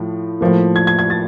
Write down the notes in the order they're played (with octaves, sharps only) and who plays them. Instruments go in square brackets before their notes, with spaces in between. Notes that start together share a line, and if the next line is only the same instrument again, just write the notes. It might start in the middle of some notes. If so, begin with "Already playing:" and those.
Already playing: [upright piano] A2 F3
A2 F3 A#3
G#6
G#6
G#6
A6